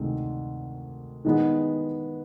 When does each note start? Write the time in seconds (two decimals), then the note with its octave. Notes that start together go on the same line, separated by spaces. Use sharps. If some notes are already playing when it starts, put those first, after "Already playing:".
Already playing: D2 C3 D#3 G#3 C4
1.25 D#3 G#3 B3